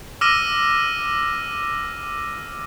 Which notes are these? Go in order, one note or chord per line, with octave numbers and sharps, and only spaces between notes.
D6 E6 F6 A#6 D#7